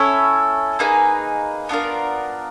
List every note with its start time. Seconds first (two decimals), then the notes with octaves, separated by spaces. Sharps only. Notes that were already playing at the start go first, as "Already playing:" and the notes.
Already playing: C#4 E4 A4 C#5
0.79 A#3 D#4 G#4 B4
1.69 B3 D4 F4 A#4